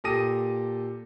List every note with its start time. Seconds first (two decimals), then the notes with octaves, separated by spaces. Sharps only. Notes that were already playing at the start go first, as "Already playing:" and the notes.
0.04 A#2 G4 A4 D#6 A#6 D#7